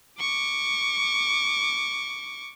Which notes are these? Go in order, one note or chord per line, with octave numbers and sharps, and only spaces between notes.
C#6 D6